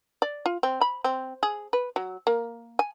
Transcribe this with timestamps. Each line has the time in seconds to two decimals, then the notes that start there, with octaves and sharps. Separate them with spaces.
0.22 D5
0.46 F4
0.63 C4
0.81 B5
1.04 C4
1.43 G#4
1.73 B4
1.96 F#3
2.27 A#3
2.79 G#5